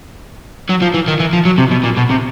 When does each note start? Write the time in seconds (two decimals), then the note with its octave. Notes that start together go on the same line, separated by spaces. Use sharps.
0.70 F#3
0.82 F3
0.94 E3
1.08 D#3
1.20 E3
1.33 F3
1.45 F#3
1.58 C3
1.71 B2
1.83 A#2
1.97 B2
2.10 C3